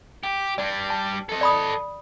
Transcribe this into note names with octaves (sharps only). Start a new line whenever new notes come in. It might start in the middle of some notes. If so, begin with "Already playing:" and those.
G4
G3 D4 D5
A5
A4 D#5
D5 B5 D#6